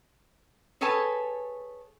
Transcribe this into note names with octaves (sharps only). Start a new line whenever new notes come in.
G#4 A4 B4 C#5 G#5 A5